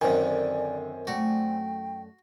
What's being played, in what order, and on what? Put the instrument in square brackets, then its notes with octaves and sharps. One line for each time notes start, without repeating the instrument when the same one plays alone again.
[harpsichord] F#2 D#3 [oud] D3 [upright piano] C4 G#5 [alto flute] D5
[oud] F#2 A3 D5 [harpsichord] F#4 [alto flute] G5